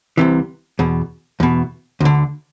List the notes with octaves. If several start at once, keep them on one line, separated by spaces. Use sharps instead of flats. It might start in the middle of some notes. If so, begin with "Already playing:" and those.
C2 C3 E3
E2 B2
E2 B2
D2 D3